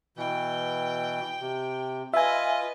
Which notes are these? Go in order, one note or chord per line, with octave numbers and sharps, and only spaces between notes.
B2 E3 G5
C3
F4 B4 D#5 E5 G#5